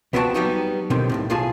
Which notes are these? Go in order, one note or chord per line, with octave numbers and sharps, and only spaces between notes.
C#2 B3 C4 F4 F#4 A5
F#3 G3 B3 D#4 F#4 G4
B2 D3 D#3 G3 C4
B1 F2 A2
B1 A2 F4 G#4 G#5 A5